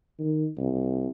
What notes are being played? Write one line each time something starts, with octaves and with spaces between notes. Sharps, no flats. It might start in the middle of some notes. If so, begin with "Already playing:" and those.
D#3
C2